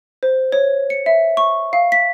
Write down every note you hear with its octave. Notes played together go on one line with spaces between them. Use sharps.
C5
C#5
C#7
E5
C#6
F5
B6